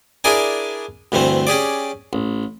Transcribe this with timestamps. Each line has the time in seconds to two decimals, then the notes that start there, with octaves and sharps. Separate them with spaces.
0.24 D4 E4 G#4 A#4 D5 G#5
1.12 D2 G2 E3 A3 C4
1.47 C#4 G4 G#4 D5
2.13 A1